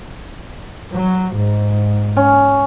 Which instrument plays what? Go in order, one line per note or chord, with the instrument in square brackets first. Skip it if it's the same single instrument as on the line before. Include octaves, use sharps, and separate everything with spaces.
[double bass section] F#3
G#2
[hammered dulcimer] C#4